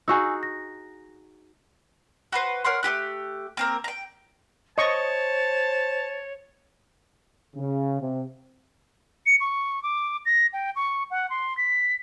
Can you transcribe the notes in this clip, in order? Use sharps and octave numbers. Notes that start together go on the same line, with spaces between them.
D#4 F#4 G#4 G#5 C#6 E6
A#6
F#4 B4 C5
A#4 C#5 F#5 C6
A3 B3 G4 F#6
A#3 C4 A#4
G5 A#5
C5 C#5 D#5 A5 C#6
C#3
C3
C#7
C#6
D6
A#6
G5
C#6
F#5
C6
B6